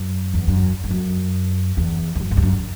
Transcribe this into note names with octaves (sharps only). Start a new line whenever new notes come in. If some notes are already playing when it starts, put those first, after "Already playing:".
Already playing: F#2
E2
F#2
G2
F#2
E2
E2
F#2
G2
E2
F#2